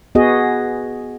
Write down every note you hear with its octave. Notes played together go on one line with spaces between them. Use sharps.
B3 F#4 G#4 D#5